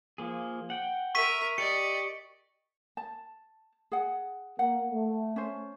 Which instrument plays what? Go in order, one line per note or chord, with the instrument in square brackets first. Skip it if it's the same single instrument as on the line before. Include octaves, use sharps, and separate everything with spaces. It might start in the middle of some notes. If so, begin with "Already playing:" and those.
[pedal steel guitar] F3 A#3 G#4
F#5 G5
[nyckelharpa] A#4 E5 [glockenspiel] C#6 B6 D#7
[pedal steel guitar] G4 [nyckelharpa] D5 D#5 [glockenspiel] C#7
[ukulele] A5
G#4 F#5
[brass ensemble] A#3 [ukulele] F#5
[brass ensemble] A3
[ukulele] C#4 C5